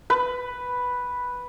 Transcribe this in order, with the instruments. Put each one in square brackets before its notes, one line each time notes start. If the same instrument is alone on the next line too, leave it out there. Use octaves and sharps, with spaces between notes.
[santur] B4